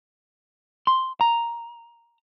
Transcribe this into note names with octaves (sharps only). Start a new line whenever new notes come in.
C6
A#5